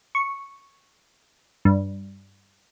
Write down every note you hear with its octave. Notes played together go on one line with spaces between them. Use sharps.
C#6
G2